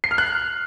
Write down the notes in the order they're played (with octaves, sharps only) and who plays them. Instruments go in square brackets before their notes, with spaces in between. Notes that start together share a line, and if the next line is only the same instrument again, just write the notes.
[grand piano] C7
F6
F#6